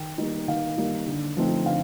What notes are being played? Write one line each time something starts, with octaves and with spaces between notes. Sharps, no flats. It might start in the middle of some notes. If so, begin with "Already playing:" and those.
Already playing: D#3 G5
G3 A#3 D#4
D#3 F5
G3 A#3 D#4
D3
F3 A3 C4 D#4
D3 F5